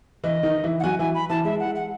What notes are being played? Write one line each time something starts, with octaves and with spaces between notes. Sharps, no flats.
E3 E4 D#5
D#3 D#4
E3 E4
F#5
F#3 F#4 G#5
E3 E4 G#5
B5
E3 E4 A5
G#3 E5
F#5
G#3
F#5